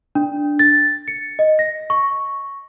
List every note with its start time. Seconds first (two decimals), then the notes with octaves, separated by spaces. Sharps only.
0.15 D4
0.59 A6
1.08 C#7
1.39 D#5
1.59 A#6
1.90 C#6